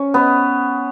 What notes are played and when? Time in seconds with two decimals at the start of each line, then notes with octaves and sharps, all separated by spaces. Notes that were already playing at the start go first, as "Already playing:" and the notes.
Already playing: C#4
0.14 B3